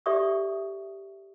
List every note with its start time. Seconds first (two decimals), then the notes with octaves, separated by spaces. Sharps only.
0.06 G4 A4 D5 E5 C#6 D#6